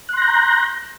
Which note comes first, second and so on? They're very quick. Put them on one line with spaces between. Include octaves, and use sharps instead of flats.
F#6 C6 A#6 G6 A#5